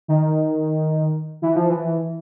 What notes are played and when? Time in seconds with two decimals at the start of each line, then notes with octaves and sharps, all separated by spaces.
0.08 D#3
1.42 E3
1.56 F3
1.69 E3